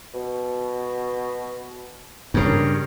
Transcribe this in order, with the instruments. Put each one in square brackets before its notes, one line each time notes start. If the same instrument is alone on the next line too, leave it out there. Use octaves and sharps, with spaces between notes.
[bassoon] B2
[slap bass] G2 C#3 [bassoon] A#4